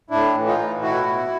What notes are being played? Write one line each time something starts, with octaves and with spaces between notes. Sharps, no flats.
A2 D4 E4
E3
D#4 F4
A2
B2 E4 F#4
B2